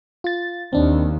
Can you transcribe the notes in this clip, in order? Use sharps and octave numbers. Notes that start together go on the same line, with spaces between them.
F4 A6
D#2 C4 D4